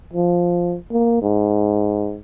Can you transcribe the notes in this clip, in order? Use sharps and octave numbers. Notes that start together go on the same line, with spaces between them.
F3
A#3
G#2